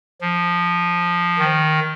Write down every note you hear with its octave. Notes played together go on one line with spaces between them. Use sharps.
F3
D#3